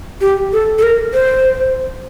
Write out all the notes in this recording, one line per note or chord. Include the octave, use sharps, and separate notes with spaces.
G4
A4
A4
A#4
C5